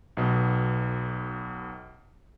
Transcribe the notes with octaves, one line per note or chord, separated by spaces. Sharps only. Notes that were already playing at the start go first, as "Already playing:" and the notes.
B1 B2